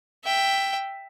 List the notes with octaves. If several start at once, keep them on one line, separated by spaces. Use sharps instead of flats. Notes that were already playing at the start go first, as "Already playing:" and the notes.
E5 G5